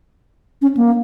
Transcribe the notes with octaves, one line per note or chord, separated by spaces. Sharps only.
C#4
A#3